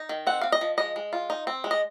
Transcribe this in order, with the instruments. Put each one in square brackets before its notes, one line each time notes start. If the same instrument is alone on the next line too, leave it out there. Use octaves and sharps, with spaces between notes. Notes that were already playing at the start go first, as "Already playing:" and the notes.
Already playing: [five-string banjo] D#4
D#3
C4 F#5
C4 F5
D#5
F3
G#3 D#5
G#3
F4
D#4
C4
G#3
D#5